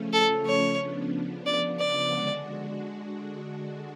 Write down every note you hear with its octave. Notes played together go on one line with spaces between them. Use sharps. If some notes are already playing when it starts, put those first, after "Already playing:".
Already playing: C#3 F3 A3 C#4
A4
C#5
C#3 F3 B3 D4
D5
D5
D3 G#3 D4 F#4